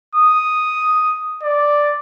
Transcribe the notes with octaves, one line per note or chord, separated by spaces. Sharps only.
D#6
D5